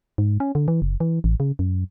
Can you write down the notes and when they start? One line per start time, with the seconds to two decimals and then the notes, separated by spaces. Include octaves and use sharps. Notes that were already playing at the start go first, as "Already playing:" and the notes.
0.18 G#2
0.40 C#4
0.55 D3
0.68 E3
0.82 F#1
1.00 E3
1.24 A1
1.40 C#3
1.59 F#2